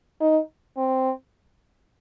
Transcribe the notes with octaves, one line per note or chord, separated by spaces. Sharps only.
D#4
C4